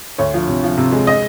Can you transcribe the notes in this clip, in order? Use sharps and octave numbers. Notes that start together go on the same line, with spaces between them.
D2 C#5
F3
C3
F3
C3
G#3
D#5